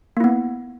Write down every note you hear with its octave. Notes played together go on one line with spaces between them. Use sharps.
A#3 B3 E4